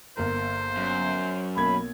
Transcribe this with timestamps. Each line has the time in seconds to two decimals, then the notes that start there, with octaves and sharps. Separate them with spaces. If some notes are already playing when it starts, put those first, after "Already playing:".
0.17 G1 A#3 A#4 C5
0.77 F#2
1.56 B1 A#3 B5 G#6